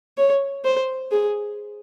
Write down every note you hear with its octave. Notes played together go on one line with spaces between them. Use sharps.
C#5
C5
G#4